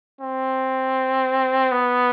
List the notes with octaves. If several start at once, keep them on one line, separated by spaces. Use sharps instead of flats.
C4
B3